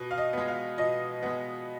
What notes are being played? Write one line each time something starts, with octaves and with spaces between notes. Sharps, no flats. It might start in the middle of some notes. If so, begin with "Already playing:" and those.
Already playing: B2 B4
F5
D#5
G#3 B3
F5
B2 D#5
G#3 B3